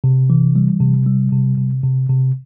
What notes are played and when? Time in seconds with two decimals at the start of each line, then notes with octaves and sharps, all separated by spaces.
0.04 C3
0.30 E3
0.56 G3
0.80 C3
1.06 G3
1.32 C3
1.58 C3
1.84 C3
2.09 C3